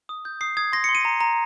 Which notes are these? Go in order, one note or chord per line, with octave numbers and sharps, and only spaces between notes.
D#6
G6
D#6 C7
D#6 G#6
C6 A#6
C#7
C6
D#7
A#5
A#5